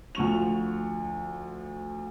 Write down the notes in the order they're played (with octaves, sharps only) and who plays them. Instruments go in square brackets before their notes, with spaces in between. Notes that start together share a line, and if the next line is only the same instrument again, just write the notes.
[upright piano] D2 F3 C#6 F7